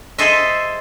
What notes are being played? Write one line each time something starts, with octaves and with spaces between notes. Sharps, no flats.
G#4 A4 C5 D#5 E5